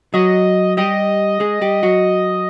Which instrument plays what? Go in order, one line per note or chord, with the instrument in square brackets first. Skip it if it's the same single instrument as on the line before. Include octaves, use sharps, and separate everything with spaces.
[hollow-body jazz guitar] F#3 F#4 [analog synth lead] D#5
[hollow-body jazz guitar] G3 G4 [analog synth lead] D#5
[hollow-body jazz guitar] G#3 G#4
G3 G4
F#3 F#4